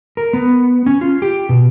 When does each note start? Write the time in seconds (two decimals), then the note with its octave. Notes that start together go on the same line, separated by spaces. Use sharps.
0.17 A#4
0.33 B3
0.86 C#4
1.01 F4
1.22 G4
1.49 B2